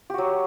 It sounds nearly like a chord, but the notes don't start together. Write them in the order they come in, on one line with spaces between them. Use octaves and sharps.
G4 F#4 F#3